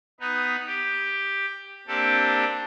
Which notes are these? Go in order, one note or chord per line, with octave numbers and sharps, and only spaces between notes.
B3 D#4 B4
G4
A#3 C4 D4 G4 A4